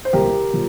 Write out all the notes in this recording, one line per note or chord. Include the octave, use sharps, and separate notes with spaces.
C5
C2 A#2 F3 G4 A#4
A#2 F3